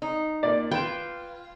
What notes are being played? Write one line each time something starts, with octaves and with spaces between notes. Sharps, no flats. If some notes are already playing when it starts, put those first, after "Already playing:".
D#4
A#2 A#3 D5
F4 B4 G5 G#6 E7